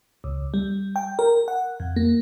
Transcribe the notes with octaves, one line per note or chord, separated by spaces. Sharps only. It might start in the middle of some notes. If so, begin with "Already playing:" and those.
C#2
G3
G5
A#4
F#5
F2
A#3